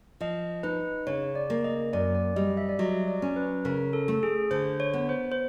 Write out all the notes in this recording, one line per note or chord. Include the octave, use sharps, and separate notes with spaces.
F3 D#5
D#4 B4
C#3 C#5
D5
A#3
D#5
F#2 D5
D5
G3 D#5
E5
D5
F#3 D#5
D5
C#4
B4
C#3 A#4
A4
A3
G#4
D3 C5
C#5
B3
C5
C5